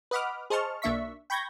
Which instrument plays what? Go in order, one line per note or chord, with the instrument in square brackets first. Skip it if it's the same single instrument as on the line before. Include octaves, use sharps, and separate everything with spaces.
[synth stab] B4 D#5 F#5 B5 D6 F6
G#4 C5 D#5 A5 C#6 F6
B1 A#3 D4 E5 C#6 B6
G5 B5 C#6 G6 G#6 A#6